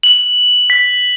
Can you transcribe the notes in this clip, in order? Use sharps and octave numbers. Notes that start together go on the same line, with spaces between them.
F#7
B6